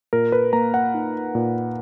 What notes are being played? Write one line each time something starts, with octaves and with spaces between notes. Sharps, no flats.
A#2 A#4
B4
A#3 A#5
F#5
D#4
A#2